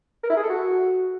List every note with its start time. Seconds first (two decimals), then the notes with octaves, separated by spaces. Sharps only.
0.24 A#4
0.30 E4
0.37 G#4
0.43 A4
0.50 F#4